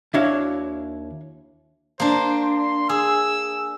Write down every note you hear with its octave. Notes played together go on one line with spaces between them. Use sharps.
D#2 D4 E4 F#4 C#5 F5
A#3 D4 C5
C6
G#4 E6